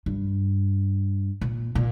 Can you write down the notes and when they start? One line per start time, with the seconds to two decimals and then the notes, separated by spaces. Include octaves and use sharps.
0.06 G2
1.41 A#2
1.75 A#2